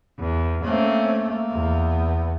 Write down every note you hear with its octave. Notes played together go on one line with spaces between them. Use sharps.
E2
A3 A#3 C4 C#4
A#3
E2 B3